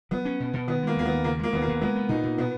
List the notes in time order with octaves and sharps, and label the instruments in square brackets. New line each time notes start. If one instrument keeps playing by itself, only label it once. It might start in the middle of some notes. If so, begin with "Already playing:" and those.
[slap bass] F#3 [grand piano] B3
[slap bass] C#4
B2
B2
[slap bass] D#3 [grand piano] B3
[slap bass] G#3 [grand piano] A#3
[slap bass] D#2 [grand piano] A#3
[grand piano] B3
[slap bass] D#2
[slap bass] C#3 [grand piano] A#3
[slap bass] G#3 [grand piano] A#3
[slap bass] D#2 [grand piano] B3
[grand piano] A#3
[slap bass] D#2
[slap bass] G#3 [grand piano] B3
[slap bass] B3
[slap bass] A#2 [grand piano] D#4
[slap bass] A#2
[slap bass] B2 [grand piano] B3